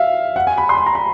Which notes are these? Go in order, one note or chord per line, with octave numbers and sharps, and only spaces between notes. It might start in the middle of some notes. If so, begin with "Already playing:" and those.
Already playing: E5 F5
F#5
G#5
B5
C6
B5
A#5
B5